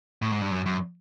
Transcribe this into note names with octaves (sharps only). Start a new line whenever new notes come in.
A2
G#2
G2
F#2
F#2